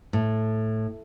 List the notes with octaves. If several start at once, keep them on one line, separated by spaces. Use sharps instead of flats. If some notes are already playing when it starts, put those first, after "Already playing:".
A2